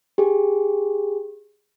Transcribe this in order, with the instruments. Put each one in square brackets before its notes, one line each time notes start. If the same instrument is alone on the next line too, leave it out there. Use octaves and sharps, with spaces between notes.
[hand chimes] G4 G#4